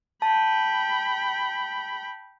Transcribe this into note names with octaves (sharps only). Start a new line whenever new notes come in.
G5 A5 B5